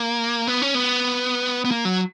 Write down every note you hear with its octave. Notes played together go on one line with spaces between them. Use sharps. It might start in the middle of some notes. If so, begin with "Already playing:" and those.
Already playing: A#3
B3
C#4
B3
B3
A#3
F#3